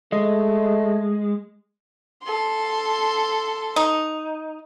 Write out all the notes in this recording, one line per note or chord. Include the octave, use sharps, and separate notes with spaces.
G#3 A3 D#5
A4 C6
D#4